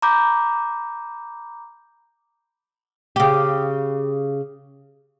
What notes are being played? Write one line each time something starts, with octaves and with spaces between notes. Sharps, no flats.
A#5 B5 D6 G6
C#3 G4